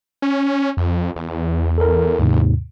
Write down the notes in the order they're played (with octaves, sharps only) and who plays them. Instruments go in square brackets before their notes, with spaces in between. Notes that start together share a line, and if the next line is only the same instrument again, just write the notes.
[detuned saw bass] C#4
F2
E2
[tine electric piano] A4 A#4
D#2 G#2 C3